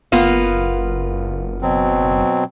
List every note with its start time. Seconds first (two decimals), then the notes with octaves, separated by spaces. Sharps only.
0.12 F#1 A#3 B3 F4
1.62 B2 F#3 C4